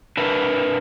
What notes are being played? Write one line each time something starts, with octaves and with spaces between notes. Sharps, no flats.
D4 A#4 B4 E5